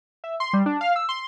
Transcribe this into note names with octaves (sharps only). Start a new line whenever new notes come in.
E5
C6
G3
D4
F5
E6
C6